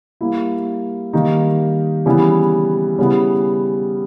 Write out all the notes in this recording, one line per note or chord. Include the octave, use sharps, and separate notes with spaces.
G3 A#3 E4
D#3 G3 A#3 D#4
C#3 E3 G3 B3 E4
C#3 G3 B3 E4